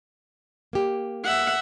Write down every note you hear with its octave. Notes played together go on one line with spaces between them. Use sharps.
A#3 G4
E5 F#5